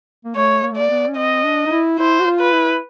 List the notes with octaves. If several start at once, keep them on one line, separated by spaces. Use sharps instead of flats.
A#3
A3 C#5
A#3
A3
A#3 D5
B3
C#4
C4 D#5
D4
D#4
E4
E4 C5
F#4
F4
B4
E4